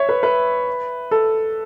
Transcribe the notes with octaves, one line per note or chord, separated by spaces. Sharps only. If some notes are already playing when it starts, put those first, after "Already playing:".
Already playing: C#5 E5
B4
B4
A4